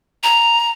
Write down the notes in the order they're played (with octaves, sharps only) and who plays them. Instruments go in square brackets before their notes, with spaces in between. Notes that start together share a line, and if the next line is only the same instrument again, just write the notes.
[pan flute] A#5